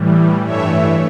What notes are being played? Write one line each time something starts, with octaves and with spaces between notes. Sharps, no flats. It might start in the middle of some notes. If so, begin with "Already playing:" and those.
Already playing: A2 E3 G3
G2 E3 A3 C#5 E5